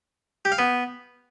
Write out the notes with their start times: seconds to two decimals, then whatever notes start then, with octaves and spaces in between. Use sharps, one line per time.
0.45 G4
0.52 F5
0.58 B3